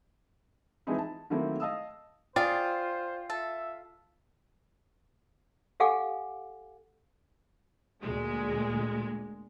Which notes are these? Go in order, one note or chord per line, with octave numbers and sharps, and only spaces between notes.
E3 F3 G#3 C4 D#4 E4
A5
D#3 F#3 A3 A#3 C4 E4
D#5 F5 A5 D#6 E6
F4 G#4 C5 D5 G5
A4 E5
G4 A4 F5 F#5 G#5 D6
D2 A#2 G#3